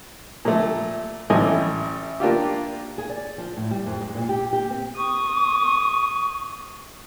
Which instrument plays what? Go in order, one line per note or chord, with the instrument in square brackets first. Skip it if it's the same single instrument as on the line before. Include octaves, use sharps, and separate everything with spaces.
[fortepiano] A#2 F3 A3
A1 G3 A3 D#5 G#5
A#3 D4 F4 G4
[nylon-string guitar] G#4
D5
F3
A2
G3
F2
G#3
A#2
G4
G4
C4
[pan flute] C#6 [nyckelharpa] D#6